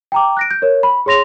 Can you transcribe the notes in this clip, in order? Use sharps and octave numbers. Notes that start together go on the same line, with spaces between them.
G5 A#5 D6
F#6 A#6 D7
G6
A#4 C#5
B5
G#4 C#5 C6 A#6 F7